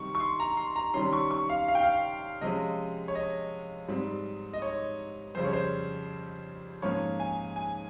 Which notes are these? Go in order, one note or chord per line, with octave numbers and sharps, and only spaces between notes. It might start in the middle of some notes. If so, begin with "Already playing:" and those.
Already playing: C3 D#3 G3 C4 C#6
C#6
C6
A#5
C6
A#5
C3 D#3 G3 C#4 C6
C#6
C#6
F5
F5
G5
F5
C3 F3 G#3 C#4 D#5
C#5
D#5
G#2 G3 C4
D#5
C#5
F2 C#3 G3 C5
C#5
C5
G#2 F3 A#3 C#4 C#5
G#5
G#5